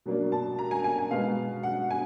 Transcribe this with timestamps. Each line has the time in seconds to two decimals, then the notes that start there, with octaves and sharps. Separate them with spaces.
0.06 B2 F#3 A#3 D4
0.32 A5
0.59 A#5
0.71 G#5
0.84 G#5
0.98 G#5
1.11 B2 G#3 B3 F5
1.63 F#5
1.91 G#5